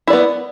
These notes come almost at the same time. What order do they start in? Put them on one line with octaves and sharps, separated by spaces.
E4 D5 B3